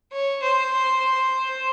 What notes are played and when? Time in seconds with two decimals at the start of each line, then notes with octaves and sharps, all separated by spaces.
0.12 C#5
0.42 C5